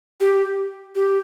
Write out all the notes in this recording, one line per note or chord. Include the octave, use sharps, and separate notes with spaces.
G4
G4